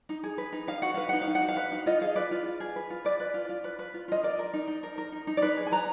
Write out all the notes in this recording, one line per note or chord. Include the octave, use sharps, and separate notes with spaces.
D#4
G#4
B4
D#4
D#4 F5
F#4 F#5
B4 F5
D#4 F#5
F5
D#4
F#5
F#4
F5
B4
D#4
F4 D#5
G#4 F5
B4 D5
F4
F4
G#4
B4
F4
B4 D5
B4
F4
F4
B4
B4
F4
F4 D#5
A#4 D5
A#4
D#4
D#4
A#4
A#4
D#4
D#4
D5
D#4 B4
G#4
G#5
B4 A#5